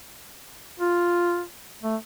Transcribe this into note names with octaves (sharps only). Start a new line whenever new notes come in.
F4
A3